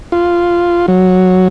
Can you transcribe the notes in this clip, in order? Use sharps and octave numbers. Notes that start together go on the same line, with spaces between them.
F4
F#3